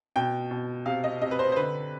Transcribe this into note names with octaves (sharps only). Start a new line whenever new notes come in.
B2 G5
B2
C3 F5
D#5
C3 D#5
B4
C5
C5
D3 B4